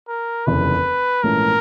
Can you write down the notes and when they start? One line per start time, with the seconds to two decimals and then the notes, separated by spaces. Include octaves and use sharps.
0.08 A#4
0.47 F1 D#2 C#3 E3 B4
1.23 A#1 G#2 E3 A3 C#4 A#4